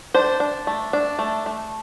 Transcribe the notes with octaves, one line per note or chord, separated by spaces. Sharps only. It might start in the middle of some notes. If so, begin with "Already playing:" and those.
D4 C5
D4
A3
D4
A3
A3